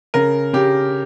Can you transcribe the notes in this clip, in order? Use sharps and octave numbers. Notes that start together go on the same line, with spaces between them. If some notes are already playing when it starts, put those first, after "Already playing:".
C#3 A#4
C#3 G4